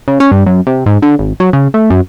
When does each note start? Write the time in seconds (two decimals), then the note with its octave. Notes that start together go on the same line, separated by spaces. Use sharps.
0.08 C#3
0.20 C#4
0.32 G2
0.46 F#2
0.67 C3
0.86 G#2
1.02 D3
1.19 G#1
1.40 F#3
1.53 C#3
1.74 A3
1.90 F#2